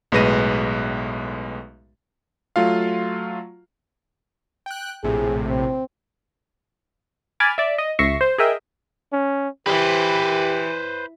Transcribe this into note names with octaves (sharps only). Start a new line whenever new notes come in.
B1 A2 G#3 B4 A#6 D#7
F#3 A3 F4 F5
G5 F#6
A#1 A2 C3 G#4
C4
G#5 B5 D6 F6 G#6 A6
D5 E5
D#5
C#2 E5 C#6 A#6 C7
C5
G#4 A#4 D#5 E5 G5
C#4
E3 G4 B4 C5